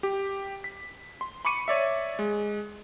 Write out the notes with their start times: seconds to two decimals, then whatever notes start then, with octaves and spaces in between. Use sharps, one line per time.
0.03 G4
0.64 B6
1.21 C6
1.45 B5 C#6 D6 C#7 D#7
1.68 C#5 D5 E5
2.19 G#3